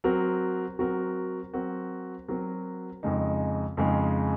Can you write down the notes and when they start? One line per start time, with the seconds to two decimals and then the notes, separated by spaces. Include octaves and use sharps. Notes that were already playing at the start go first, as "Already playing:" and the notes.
0.04 F#3 C4 F#4 A#4
0.79 F#3 C4 F#4 A#4
1.54 F#3 C4 F#4 A#4
2.28 F#3 C4 F#4 A#4
3.03 F2 C#3 G#3 D#4
3.77 F2 C#3 G#3 D#4